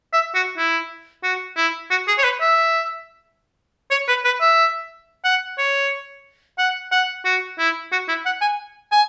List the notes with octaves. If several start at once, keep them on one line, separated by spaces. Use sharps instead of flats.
E5
F#4
E4
F#4
E4
F#4
G#4
C#5
B4
E5
C#5
B4
B4
E5
F#5
C#5
F#5
F#5
F#4
E4
F#4
E4
F#5
G#5
G#5